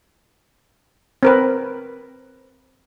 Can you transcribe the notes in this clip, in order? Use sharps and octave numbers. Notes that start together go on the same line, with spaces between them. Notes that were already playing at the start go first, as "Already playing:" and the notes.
C4 A#4 B4